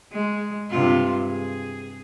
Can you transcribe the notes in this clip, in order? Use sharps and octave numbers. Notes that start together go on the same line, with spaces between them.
G#3
G2 C3 F4
G#4